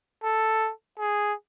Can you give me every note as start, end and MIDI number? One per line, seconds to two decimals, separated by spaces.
0.24 0.71 69
0.99 1.33 68